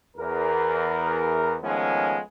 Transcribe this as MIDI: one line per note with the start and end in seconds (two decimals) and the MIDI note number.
0.17 1.55 40
0.17 1.55 70
1.61 2.19 51
1.61 2.19 53
1.61 2.19 56
1.61 2.19 57
1.61 2.19 59
1.61 2.19 61